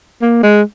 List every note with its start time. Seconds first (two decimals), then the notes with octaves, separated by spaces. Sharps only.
0.22 A#3
0.43 G#3